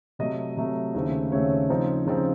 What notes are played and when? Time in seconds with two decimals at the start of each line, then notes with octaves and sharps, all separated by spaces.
0.19 C3 F#3 A3 D#5
0.56 C3 F#3 A3 D#5
0.94 D#2 C#3 A3 C4
1.32 D#2 C#3 A3 C4 C#5
1.70 C#3 F3 C4 D#4
2.07 C#3 F3 C4 D#4